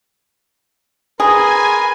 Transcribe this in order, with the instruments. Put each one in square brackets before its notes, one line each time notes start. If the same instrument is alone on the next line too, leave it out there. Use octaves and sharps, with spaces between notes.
[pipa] G#4 [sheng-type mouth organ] A#4 B4 C6 [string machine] G#5